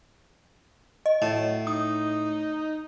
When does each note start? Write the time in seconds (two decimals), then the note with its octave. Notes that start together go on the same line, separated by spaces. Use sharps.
1.06 D#5
1.22 A2 A5
1.34 F#3
1.67 D#4 D#6